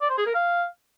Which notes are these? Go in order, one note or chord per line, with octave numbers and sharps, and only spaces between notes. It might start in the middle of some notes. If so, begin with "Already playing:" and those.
D5
C5
G#4
A#4
F5